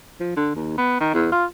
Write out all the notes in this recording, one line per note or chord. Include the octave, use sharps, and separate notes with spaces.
F3
D3
D#2
B3
D#3
E2
F4